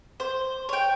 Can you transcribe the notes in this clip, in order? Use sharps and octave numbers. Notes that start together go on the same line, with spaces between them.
C5
C#5 G5